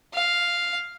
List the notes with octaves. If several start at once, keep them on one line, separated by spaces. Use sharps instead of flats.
F5